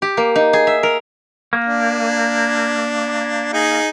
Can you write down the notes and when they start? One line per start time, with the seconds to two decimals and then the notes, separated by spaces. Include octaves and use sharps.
0.02 G4
0.17 A#3
0.35 D#4
0.53 G#4
0.67 E5
0.83 A#4
1.53 A#3
1.64 D4
3.53 D#4 G#4